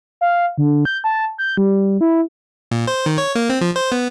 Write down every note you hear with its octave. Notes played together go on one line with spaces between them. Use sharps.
F5
D3
G6
A5
G6
G3
E4
A#2
C5
D#3
C#5
A#3
C4
F3
C5
B3